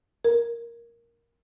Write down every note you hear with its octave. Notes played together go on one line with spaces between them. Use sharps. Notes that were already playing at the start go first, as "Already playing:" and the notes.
A#4